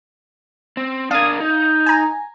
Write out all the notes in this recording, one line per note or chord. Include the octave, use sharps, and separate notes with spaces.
C4
D4 A#4 F5 D#6 G#6
D#4 G6
G#5 A#5